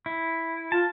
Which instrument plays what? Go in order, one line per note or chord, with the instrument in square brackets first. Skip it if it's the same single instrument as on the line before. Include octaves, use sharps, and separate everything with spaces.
[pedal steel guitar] E4
[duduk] F4 [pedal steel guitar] A5